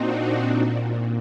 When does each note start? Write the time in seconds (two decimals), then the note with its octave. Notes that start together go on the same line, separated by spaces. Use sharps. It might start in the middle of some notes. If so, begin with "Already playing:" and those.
Already playing: A#2 C4 D4 D#4 F#4
0.42 A#2